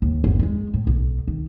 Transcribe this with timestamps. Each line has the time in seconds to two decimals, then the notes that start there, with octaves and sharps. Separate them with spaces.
0.02 D#2
0.24 G1 E2
0.39 G3 G#3
0.74 A2
0.87 B1
1.28 D#3